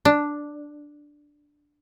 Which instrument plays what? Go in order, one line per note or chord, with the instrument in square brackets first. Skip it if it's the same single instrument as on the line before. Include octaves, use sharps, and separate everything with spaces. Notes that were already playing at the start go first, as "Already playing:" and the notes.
[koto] D4